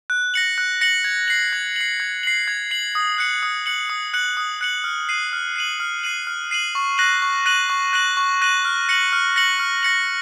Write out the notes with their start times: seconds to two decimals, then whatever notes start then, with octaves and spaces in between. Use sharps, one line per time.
0.10 F#6
0.34 A#6 C#7 F#7
0.58 F#6
0.81 A#6 C#7 F#7
1.04 G#6
1.28 C7 F#7
1.53 G#6
1.76 C7 F#7
2.00 G#6
2.23 C7 F#7
2.48 G#6
2.71 C7 F#7
2.95 D#6
3.18 F#6 C#7 F#7
3.43 D#6
3.66 F#6 C#7 F#7
3.90 D#6
4.14 F#6 C#7 F#7
4.37 D#6
4.61 F#6 C#7 F#7
4.84 F6
5.09 C7 D#7 F#7
5.33 F6
5.56 C7 D#7 F#7
5.80 F6
6.04 C7 D#7 F#7
6.27 F6
6.51 C7 D#7 F#7
6.75 C#6
6.98 F#6 A#6 D#7 F#7
7.22 C#6
7.46 F#6 A#6 D#7 F#7
7.70 C#6
7.93 F#6 A#6 D#7 F#7
8.17 C#6
8.42 F#6 A#6 D#7 F#7
8.65 F6
8.89 A#6 C#7 F#7
9.13 F6
9.36 A#6 C#7 F#7
9.59 F6
9.83 A#6 C#7 F#7